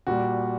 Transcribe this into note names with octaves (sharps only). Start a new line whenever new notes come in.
A#2 G3 F#4